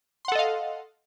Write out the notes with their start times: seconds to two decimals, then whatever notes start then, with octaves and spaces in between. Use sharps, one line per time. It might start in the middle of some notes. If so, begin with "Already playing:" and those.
0.25 C6
0.28 F#5
0.32 A4
0.35 D#5
0.39 F5